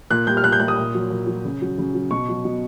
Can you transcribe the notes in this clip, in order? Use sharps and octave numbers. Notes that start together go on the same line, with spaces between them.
A#2 F#6
G3 G6
F6
A#2 F#6
G6
G3 F#6
D#6
A#2
F#3
A#2
F#3
C#3
F#3
C#3
F#3
B2 C#6
F#3
B2